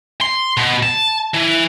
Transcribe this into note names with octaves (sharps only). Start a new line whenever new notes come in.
C6
B2
A5
E3